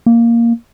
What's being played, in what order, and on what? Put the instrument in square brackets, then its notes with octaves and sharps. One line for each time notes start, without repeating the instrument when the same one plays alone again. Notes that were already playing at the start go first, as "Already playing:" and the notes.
[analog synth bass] A#3